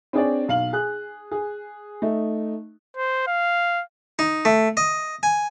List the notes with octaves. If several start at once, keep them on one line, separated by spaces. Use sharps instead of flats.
C4 D4 G#4 C#5 D5
B1 F5 F#7
G#4 F#6
G#4
A3 D#4
C5
F5
D#4
A3
D#5
G#5